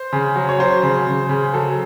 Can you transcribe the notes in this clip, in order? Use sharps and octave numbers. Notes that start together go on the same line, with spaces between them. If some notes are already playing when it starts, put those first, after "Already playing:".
Already playing: C5
C#3
F#3
C#5
F#3 C5
C#3
C#3
C#3
F#3 A4